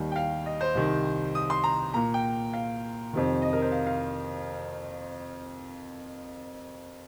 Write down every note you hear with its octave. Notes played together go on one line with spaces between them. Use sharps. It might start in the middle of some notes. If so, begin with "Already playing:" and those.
Already playing: D#2 D#3 G3
G5
F5
D#5
C5
C2 C3 D#3
D#6
C6
A#5
A#2 A#3 A#5
G5
F5
F2 C3 D#3
D#5
A#4
C5
F5
F5